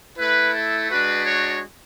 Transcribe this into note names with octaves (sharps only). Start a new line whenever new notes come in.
A3 E4 B4
A4
G#3 D4 F#4 B4
C#5